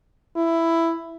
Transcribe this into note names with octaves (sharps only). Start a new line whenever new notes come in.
E4